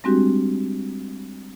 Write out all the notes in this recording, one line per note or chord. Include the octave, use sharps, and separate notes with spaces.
G3 G#3 C4 D4 F#4 G4